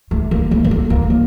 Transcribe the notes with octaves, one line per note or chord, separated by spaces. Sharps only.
A3
A#3
A3
A#3
A3
A#3
D3